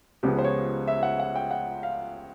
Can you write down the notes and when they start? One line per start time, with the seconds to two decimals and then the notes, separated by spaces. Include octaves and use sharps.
0.23 C#2 C#3 F3 G#3 B3 G4
0.39 C5
0.44 C#5
0.87 E5
1.03 F#5
1.20 F#5
1.36 G5
1.51 F#5
1.83 F5